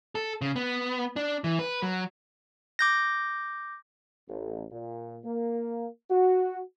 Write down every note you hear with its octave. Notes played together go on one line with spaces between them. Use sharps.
A4
C#3
B3
D4
E3
B4
F#3
D6 G6 A#6
A1
A#2
A#3
F#4